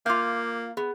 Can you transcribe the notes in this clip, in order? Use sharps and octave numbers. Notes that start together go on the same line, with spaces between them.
A#3 F4 F5 D6 G6
B3 G#4